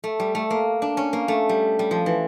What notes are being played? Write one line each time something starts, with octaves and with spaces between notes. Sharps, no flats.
A3
G3
A3
A#3
D4
C#4
A#3
A3
G3
G3
F3
E3